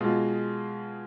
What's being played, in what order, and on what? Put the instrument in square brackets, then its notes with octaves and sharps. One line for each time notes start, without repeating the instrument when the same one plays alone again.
[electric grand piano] B2 G#3 F4